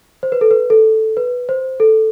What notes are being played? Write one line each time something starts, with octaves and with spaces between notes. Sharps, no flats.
C5
B4
A4
B4
A4
B4
C5
A4